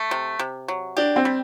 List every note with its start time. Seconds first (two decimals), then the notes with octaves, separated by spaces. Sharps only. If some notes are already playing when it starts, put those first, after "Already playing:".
Already playing: A3
0.11 C3
0.39 C3
0.68 F#3
0.97 D4 G4
1.16 C4
1.25 G3